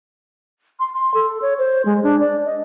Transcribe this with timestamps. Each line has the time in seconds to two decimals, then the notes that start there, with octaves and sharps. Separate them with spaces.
0.79 C6
0.94 C6
1.14 A4
1.42 C#5
1.58 C5
1.85 G#3
2.03 D4
2.20 D5
2.45 D#5